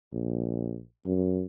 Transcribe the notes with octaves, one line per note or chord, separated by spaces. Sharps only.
A#1
F#2